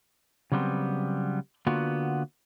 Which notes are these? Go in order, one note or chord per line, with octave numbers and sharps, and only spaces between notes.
C#3 F#3 G3 B3 C4
D3 A#3 B3 F4 F#4